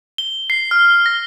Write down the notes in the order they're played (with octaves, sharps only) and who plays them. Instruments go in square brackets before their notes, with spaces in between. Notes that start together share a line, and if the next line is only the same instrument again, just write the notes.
[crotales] G7
C7
F6
A#6